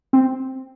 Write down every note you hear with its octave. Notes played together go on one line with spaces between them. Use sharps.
C4